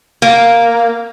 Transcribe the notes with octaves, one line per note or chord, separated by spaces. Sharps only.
A#3